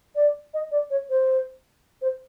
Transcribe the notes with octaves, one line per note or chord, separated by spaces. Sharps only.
D5
D#5
D5
C#5
C5
C5